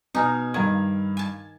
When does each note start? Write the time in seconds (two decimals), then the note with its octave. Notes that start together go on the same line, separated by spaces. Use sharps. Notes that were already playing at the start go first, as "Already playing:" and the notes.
0.15 B2 D#4 G#5 F6
0.54 G2 D#3 F5 G#6
1.17 G#5 A5